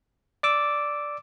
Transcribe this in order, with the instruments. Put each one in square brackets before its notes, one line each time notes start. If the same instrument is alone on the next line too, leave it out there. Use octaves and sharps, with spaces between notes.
[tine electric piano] D5 D6 E6